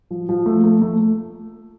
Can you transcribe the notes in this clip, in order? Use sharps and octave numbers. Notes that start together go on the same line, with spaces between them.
F3
F3
A3
A3
A3